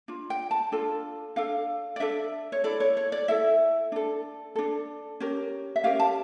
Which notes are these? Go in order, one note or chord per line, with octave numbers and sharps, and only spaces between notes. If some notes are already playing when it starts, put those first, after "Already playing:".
D4 F4
G5
A5
D4 F4 A4
D4 A4 F5
D5
D4 A4 E5
C#5
E4 A4 D5
C#5
C#5
D5
E4 A4 E5
D4 A4
D4 A4
C#4 G4 A#4
E5
C#4 G4 A#4 F5
A5